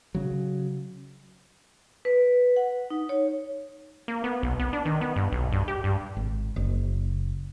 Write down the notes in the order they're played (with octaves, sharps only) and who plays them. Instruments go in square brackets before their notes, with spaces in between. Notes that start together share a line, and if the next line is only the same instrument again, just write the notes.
[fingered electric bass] C#3 F#3
[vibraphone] B4
F#5
D#4
C#5
[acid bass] A#3
B3
B1
B3
D4
D#3
B3
G2
B1
G2
G4
G2
[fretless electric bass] G#1
F#1